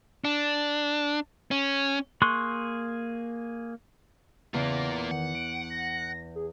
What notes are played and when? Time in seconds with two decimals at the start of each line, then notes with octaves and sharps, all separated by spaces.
0.25 D4
1.51 C#4
2.22 A#3 G#4 C6 C#6 F#6
4.54 E2 C#3 A#3 F4
5.11 D#3 F#5
5.35 D7
5.70 A#6
6.35 G#4